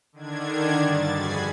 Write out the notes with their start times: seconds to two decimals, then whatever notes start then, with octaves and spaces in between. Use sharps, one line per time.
0.12 D3 D#3 D4 G#6
0.81 G2 A6
1.13 F2 F#4 G#4 B5 G#6 C7